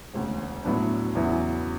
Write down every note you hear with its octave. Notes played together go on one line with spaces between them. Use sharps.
E1 D2 C#3
A2 F#3 B3 D4
E2 C#3 F#3 B3 E4